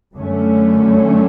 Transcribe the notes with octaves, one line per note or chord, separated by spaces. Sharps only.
F#2 D3 A3 C#4